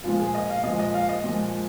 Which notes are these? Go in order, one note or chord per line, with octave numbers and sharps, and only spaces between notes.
A#2 F3 G#3 F4
G#4
D#5
F5
A#2 F3 G#3 D#5
D#5
F5
D#5
A#2 F3 G#3